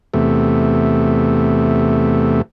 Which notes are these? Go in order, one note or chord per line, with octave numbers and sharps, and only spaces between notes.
E2 C3 A3